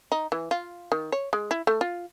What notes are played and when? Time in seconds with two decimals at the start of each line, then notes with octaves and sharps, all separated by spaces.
0.12 D#4
0.32 E3
0.51 F4
0.92 D#3
1.12 C#5
1.33 G#3
1.51 E4
1.67 A3
1.81 F4